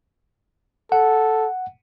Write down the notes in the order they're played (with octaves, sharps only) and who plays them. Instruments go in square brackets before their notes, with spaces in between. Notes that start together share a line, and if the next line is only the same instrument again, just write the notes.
[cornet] A4 [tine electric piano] F#5